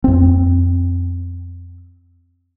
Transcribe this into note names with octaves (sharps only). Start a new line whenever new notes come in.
F2 C4